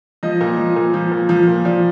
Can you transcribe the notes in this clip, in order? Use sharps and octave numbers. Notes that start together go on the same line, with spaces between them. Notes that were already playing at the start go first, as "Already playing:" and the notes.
F3 D#5
A#2
F3
A#2
F3
A#2
F3
A#2
F3 D5